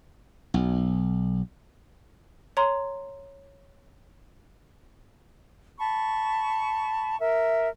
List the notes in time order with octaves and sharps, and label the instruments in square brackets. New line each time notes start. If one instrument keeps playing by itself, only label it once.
[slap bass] B1
[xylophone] C#5 A#5 C6
[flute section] A5 B5 C#6
A#4 E5